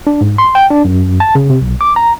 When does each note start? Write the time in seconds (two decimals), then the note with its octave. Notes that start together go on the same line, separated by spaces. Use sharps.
0.07 D4
0.21 G#2
0.38 C6
0.55 G5
0.70 D4
0.85 F#2
1.20 A5
1.35 C#3
1.50 C3
1.62 B1
1.81 D6
1.96 A#5